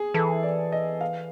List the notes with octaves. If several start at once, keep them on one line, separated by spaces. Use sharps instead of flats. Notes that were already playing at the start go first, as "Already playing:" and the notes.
Already playing: G#4
E3 A4
D5
D#5
F5